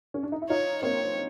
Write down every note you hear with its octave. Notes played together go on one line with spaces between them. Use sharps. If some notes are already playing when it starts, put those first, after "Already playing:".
C#4
D4
D#4
E4
D#4 F4 C#5
A#3 C4 C#5